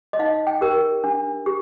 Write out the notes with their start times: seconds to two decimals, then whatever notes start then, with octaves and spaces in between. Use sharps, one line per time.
0.13 D#5
0.19 D#4 F5
0.47 G5
0.61 G4 A#4
1.04 D4
1.46 G4